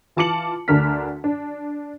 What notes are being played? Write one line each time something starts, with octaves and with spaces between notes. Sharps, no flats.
E3 F4 A5 D6 C#7 F#7
D2 D3 D4 A#4 F6 B6
D4